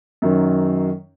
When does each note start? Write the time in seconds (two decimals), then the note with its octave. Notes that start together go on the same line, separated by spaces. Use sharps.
0.22 F#2 D#3 F#3